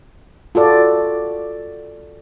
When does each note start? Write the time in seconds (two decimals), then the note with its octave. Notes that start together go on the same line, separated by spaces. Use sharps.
0.55 F4 F#4 A4 D5